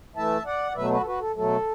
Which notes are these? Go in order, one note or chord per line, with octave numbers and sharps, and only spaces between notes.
E3 A3 E4 E5 A5
D5 F#5
D5
B2 F#3 A3 B4 E5
F#4 B4
A4
F#4 B4
A4
B2 F#3 A3 A4